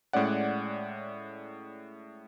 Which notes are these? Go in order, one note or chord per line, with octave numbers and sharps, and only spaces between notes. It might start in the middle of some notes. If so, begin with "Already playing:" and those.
A2 G#3 C#4 D5 F#5